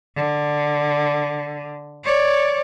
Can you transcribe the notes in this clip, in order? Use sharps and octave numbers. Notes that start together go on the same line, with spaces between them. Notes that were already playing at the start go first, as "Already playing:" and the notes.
D3
C#5 D5